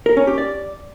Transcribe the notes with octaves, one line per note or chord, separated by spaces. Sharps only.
A#4
C#4
G4
D5